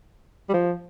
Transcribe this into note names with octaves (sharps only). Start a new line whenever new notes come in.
G3
F3